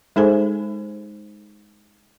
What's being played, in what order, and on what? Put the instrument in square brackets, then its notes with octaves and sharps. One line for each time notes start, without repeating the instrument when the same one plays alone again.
[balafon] G#3 D#4 G#4 A4 C5 G#5